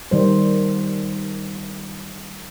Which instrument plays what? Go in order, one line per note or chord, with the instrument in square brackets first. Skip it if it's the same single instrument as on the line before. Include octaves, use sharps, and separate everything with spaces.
[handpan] D#3 G3 C5